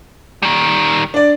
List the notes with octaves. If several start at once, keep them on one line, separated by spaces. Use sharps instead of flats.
D#3 G3
D4 D5